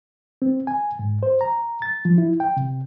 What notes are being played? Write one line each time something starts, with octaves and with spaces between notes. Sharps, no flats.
C4
G#5
G#2
C5
A#5
A6
F3
E4
G5
C3